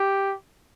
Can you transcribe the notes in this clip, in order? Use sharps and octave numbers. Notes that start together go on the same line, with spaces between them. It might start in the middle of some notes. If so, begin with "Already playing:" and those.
Already playing: G4